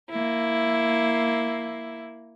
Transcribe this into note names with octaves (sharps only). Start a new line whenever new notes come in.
A#3 E4